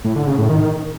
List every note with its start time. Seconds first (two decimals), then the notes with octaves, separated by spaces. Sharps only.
0.04 A2
0.16 D3
0.27 C#3
0.38 A2
0.49 D#3